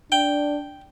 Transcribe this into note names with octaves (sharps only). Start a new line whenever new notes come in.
D4 G5